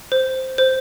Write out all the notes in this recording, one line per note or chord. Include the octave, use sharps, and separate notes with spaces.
C5
C5